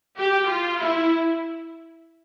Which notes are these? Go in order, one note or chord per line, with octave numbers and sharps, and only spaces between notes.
G4
F4
E4